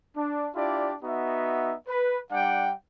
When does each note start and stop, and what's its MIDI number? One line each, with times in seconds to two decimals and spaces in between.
0.16 0.48 62
0.55 0.94 62
0.55 0.94 64
0.55 0.94 65
0.55 0.94 67
0.55 0.94 74
1.03 1.74 59
1.03 1.74 63
1.03 1.74 66
1.03 1.74 76
1.88 2.20 71
2.32 2.72 55
2.32 2.72 62
2.32 2.72 78
2.32 2.72 79